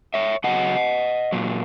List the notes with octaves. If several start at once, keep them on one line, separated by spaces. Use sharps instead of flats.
C#5 E5
C#3 F#3 D#5 F#5
A#2 F#3